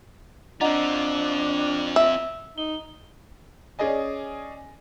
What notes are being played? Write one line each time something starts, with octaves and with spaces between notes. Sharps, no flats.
C4 D4 F4 D#5 F#5 A#5
E5
D#4 G7
C#4 G#4 D5 D#5 G#5